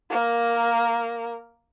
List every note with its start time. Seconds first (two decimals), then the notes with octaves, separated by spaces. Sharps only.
0.10 A#3 A#4